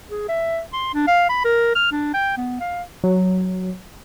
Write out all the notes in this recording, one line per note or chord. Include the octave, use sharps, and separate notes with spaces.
G#4
E5
C6
D4
F5
B5
A#4
F6
D4
G5
B3
F5
F#3